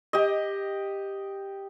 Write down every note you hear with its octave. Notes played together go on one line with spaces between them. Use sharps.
G4 D#5